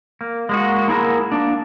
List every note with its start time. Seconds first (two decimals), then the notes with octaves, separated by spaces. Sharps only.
0.21 A#3
0.49 G#3 A#3 F#4
0.88 A#3 E4 G#4 A#4
1.32 A#3 D4